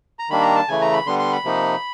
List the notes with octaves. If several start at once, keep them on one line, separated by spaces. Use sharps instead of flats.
A#5
D#3 G3 A#3 D4 B5
A#5
A5
C#3 E3 A3 G#5
A#5
B5
D3 G3 B3 C6
C6
B5
C3 F3 A#3 D#4